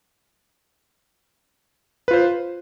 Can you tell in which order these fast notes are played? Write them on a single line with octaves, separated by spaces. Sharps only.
B4 F4 C5